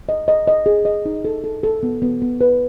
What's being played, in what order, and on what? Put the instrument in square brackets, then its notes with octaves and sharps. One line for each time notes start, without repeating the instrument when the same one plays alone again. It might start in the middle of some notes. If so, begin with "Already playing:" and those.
[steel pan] D#5
D#5
D#5
G#4
D#5
D#4
A4
A4
A4
B3
B3
B3
B4